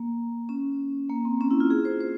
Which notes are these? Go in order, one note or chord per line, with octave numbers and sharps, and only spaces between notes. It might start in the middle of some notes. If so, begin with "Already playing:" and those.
Already playing: A#3
C#4
A#3
C4
C#4
E4
F4
G#4
C5
C5